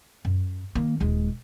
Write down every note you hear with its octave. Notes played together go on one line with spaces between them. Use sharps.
F#2
D#3 A#3
D#1 G#3